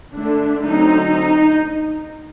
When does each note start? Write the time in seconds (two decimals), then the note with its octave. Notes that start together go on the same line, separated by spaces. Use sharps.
0.13 D3 A3 D4
0.62 D3 F#3 A3 C4 D#4